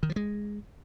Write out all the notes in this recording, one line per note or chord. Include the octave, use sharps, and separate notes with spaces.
D#3
F3
G#3